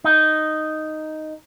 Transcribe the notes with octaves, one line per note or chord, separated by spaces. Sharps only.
D#4